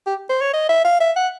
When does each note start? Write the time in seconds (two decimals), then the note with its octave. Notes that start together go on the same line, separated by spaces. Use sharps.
0.06 G4
0.30 C5
0.41 C#5
0.53 D#5
0.69 E5
0.85 F5
1.00 E5
1.16 F#5